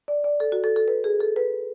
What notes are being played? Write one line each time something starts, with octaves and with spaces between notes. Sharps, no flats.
D5
D5
A4
F#4
A4
A4
B4
G#4
A4
B4